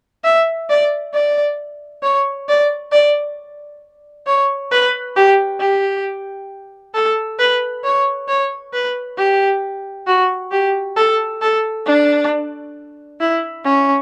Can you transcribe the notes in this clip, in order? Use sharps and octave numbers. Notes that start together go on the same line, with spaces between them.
E5
D5
D5
C#5
D5
D5
C#5
B4
G4
G4
A4
B4
C#5
C#5
B4
G4
F#4
G4
A4
A4
D4
E4
C#4